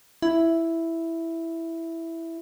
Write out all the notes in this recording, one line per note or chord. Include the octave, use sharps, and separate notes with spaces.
E4